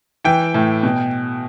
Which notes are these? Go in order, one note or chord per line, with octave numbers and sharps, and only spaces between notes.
E3 G5
A2
B2